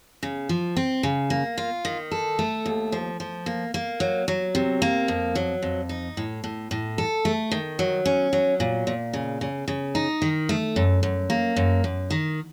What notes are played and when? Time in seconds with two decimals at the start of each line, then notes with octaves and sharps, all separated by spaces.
0.23 C#3
0.49 F3
0.77 C4
1.03 C#3
1.30 A#3
1.58 F4
1.85 D#3
2.12 A4
2.39 A3
2.66 D#2
2.92 F3
3.20 F3
3.46 A#3
3.74 A#3
4.00 F#3
4.28 F#3
4.55 C3
4.82 A#3
5.08 F2
5.35 F#3
5.63 F2
5.89 D#4
6.17 A2
6.44 A2
6.71 A2
6.98 A4
7.25 A3
7.51 D#3
7.79 F#3
8.06 C#4
8.33 F#3
8.60 A#2
8.87 A#2
9.13 C#3
9.41 C#3
9.68 C#3
9.95 D#4
10.22 D#3
10.49 A3
10.76 F#2
11.03 F#2
11.30 A#3
11.56 F#2
11.84 F#2
12.11 D#3